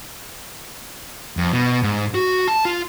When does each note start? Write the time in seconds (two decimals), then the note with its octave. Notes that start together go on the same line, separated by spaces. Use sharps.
1.37 F2
1.53 B2
1.83 G#2
2.14 F#4
2.48 A5
2.65 F4